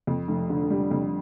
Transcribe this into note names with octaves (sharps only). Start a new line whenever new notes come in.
F2
F1
D3
G3
F2